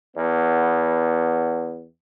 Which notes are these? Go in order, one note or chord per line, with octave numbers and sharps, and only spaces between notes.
E2 B3